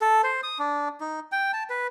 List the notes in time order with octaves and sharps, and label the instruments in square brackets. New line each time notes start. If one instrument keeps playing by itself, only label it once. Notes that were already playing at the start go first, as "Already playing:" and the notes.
[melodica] A4
C5
D#6
D4
D#4
G5
A5
B4